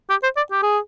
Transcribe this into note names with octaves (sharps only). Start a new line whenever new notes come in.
G4
C5
D5
G4
G#4